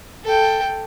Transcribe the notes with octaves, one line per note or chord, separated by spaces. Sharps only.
A4 G5